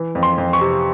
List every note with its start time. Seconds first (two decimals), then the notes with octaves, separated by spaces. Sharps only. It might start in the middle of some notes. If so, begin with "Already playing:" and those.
Already playing: E3
0.15 F2
0.23 C6
0.38 F2
0.53 C#6
0.61 C3